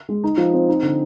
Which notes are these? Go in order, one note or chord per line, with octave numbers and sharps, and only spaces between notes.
G#3
D#4
F3
C4
D#4
D3